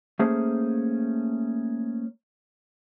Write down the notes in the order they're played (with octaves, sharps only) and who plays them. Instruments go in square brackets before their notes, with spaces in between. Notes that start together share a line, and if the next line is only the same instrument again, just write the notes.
[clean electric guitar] A3 A#3 C#4 G#4 C5